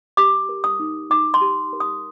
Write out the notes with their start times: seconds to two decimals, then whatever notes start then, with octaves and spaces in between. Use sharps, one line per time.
0.17 G4 D6
0.49 A#4
0.64 D#6
0.80 D#4
1.10 D#4 D6
1.34 C6
1.41 G4
1.73 A#4
1.80 D#6